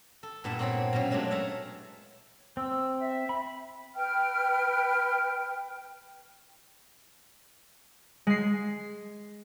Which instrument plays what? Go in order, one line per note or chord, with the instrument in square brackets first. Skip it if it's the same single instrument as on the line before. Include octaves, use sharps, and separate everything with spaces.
[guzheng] A4
G2 A#2 B3 E4 E5 A5
A#2 B3 C4 C#5 B5
B2 F#3 G3 A#3 C#4
F#3 G#3 A3 D4
C#5 E5 F5 A5 A#5
[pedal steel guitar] C4 [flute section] E6
[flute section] E5
[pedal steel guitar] B5
[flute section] B4 G5 F6
[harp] G#3 C7